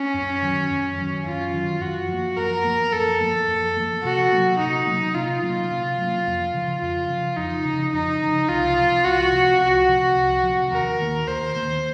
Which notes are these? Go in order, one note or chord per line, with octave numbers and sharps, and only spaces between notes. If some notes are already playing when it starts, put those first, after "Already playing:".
Already playing: C#4
F#2
D#3 F#3
F#2
D#3 F#3
F#2 F4
D#3 F#3
F#2 F#4
F3 A#3
F#2 A#4
F3 A#3
F#2 A4
F3 A#3
F#2
F3 A#3
C3 F#4
F#3 A#3 C#4
C3 D#4
F#3 A#3 C#4
C3 F4
F#3 A#3 C#4
C3
F#3 A#3 C#4
F2
C#3 F3
F2 F4
C#3 F3
F2 D#4
C#3 F3
F2 D#4
C#3 F3
C2 F4
C3 F3
C2 F#4
C3 F3
C2 F#4
C3 F3
C2
F3
C3
D#2 A#4
D#3 A#3
D#2 C5
D#3 A#3